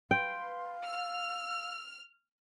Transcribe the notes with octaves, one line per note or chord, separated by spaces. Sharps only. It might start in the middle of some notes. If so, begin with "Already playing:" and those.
B4 F5 G5 C6
E6 F6